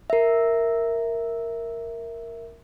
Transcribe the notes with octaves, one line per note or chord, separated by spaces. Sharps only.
A#4 E5